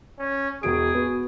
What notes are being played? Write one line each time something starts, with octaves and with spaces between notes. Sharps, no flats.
C#4
E1 F#4 G#4 D7
B3 F#4